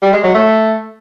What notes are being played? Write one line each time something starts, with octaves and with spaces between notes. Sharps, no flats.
G3
G#3
F#3
A3